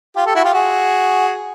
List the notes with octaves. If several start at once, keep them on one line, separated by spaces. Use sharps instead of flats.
F4 G4
G4 A4
E4 F#4
F4 G4
F#4 G#4